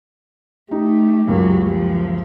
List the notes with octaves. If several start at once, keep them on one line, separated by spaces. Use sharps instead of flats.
A3 D#4 G4
C#2 F#2 F#3 A#3
F3